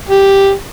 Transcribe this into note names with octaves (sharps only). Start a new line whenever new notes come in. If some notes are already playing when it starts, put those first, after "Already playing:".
G4